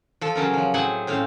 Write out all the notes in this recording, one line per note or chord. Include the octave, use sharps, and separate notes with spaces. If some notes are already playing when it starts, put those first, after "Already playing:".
F3 A4
C#3 F#3 C#4 A#4
F3 F#3
A2 F#3 C4 G#4 F#5 G#5
A2 C4 C#4 F5